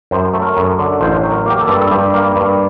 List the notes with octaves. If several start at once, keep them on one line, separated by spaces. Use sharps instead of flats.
F#2 C5
A3
A#4
F#2
D3
A1 C5
F#3
A#4
A#3 G4
A4
G2
A4
G2 G4
A#3
G2